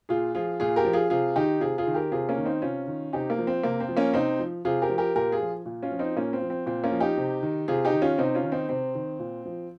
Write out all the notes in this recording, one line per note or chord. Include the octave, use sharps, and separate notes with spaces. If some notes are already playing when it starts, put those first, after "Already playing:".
A#2 F4 G#4
F3 F4 G#4
A#2 F4 G#4
G4 A#4
F3
F4 G#4
C3 F4 G#4
D#3 D#4 G4
C3 F4 G#4
F4 G#4
D#3
G4 A#4
C3 F4 G#4
A#3 C#4
D#3
C4 D#4
C3 C#4 F4
D#3
C3 D#4 G4
A#3
F3
C4
C3 A#3
C4
F3
A#3 C#4
C3 C4 D#4
F3
C3 F4 G#4
G4 A#4
F3
G4 A#4
A#2 G4 A#4
F4 G#4
F3
A#2
C#4 F4
F3
C4 D#4
A#2 A#3 C#4
C4
F3
C4
A#2 C4
A#3 C#4
F3
D#4 G4
C3
D#3
C3 F4 G#4
D#4 G4
D#3
C#4 F4
C3 C4 D#4
C#4 F4
D#3
C4 D#4
C3 C4
D#3
A#2
F3